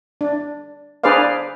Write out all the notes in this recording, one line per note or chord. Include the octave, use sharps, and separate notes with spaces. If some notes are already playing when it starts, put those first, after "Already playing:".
D4
D4 G#4 B4 C5 D5 F5